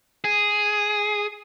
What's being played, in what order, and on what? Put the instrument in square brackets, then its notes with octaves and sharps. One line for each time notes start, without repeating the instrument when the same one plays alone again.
[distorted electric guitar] G#4